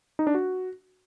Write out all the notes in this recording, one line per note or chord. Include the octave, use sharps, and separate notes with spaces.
D#4
D4
F#4